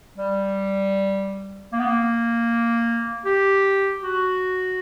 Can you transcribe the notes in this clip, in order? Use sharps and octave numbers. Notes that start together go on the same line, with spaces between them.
G3
A#3
B3
A#3
G4
F#4